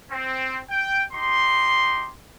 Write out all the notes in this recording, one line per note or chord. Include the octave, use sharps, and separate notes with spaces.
C4
G5
D#4 G4 C6